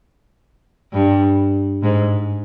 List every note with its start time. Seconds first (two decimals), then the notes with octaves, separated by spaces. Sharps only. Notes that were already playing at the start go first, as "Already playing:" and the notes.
0.93 G2
1.83 G#2